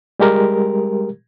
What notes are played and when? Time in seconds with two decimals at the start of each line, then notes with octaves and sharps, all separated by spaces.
0.19 G3 G#3 G4 A#4